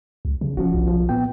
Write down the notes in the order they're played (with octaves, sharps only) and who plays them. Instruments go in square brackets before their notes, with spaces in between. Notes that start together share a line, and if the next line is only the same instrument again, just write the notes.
[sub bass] C#2
C#3
[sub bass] E1 [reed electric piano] F3 C#4 F#4
[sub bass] B1
[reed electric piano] F3
A#2 B3 G5